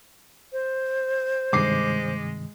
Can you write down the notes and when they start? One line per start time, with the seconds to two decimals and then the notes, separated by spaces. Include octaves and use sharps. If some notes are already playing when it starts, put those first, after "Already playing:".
0.53 C5
1.53 G2 C3 D#3 G#3 D6 C7